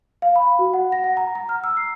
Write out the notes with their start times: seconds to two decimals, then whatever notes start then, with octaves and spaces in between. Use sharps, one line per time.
0.22 F5
0.36 B5
0.59 F#4
0.74 F#5
0.92 A#6
1.04 F#5
1.17 A#5
1.35 A#5
1.49 F6
1.64 E6
1.77 C7